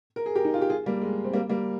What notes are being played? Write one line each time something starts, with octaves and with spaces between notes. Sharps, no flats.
A#4
G#4
G4 A#4
D#4
F4
G4
F4 G#4
G3 A#3
G#3
C4
G3 A#3
G3 A#3